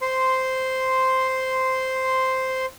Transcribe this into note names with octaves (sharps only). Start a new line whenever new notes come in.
C5 C6